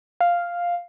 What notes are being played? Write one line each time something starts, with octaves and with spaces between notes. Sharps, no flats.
F5